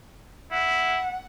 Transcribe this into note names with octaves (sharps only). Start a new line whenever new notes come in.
E4 F#5